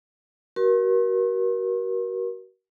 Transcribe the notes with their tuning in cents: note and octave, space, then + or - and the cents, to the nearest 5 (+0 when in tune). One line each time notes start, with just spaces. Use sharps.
F#4 +35 A#4 +35 C6 +45